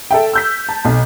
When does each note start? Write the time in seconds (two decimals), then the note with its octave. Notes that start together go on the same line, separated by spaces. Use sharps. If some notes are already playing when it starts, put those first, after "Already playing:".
0.11 A4 E5 G5
0.33 E6 G6 B6
0.69 A5
0.85 B1